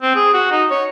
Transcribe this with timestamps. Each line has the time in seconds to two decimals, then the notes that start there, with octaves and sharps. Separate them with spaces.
0.02 C4
0.15 G#4
0.34 F#4
0.51 D#4
0.71 C#5